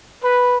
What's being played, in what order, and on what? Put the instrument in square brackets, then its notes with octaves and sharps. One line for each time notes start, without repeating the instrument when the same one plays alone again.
[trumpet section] B4